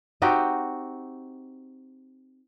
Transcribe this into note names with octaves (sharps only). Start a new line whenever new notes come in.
C4 D#4 F#4 G4